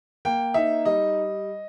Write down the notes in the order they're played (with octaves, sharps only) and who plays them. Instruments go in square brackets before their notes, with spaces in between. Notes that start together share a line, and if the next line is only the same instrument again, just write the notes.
[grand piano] A#3 G5
D#4 E5
G3 D#5